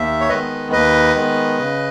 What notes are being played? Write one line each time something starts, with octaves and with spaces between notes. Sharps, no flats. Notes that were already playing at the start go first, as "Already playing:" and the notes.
Already playing: D#2 E5
C#5
D#3 G#3 B3 B4 D#5
D#2 B4 D#5
D#3 G#3 B3
C#3